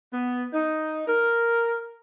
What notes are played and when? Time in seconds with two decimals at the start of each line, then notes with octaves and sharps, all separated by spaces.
0.13 B3
0.53 D#4
1.07 A#4